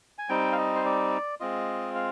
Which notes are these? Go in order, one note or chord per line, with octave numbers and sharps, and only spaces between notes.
G#5
G3 C4 D#4 G5
F5
D#5
C5
D5
G#3 C4 F4 D#5
F5